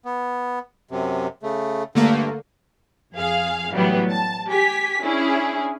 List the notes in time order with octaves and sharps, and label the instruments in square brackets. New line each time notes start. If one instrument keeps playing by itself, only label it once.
[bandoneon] B3
F#2 C3
C#3 A3
[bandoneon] G2 [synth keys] D3 A3 A#3
[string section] F2 G#4 F5
A2 E3 F#3 G3 B3
A5
G4 G#5 B6
C#4 D4 E4 G#4